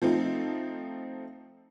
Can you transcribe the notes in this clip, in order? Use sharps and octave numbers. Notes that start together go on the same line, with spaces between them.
F3 A3 C4 D#4